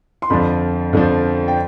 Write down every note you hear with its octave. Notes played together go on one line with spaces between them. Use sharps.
C6
F2 D3 F3 B5
F2 D3 F3
G5